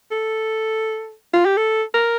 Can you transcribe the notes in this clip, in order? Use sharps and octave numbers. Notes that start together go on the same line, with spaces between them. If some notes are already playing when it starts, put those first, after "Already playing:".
A4
F4
G4
A4
A#4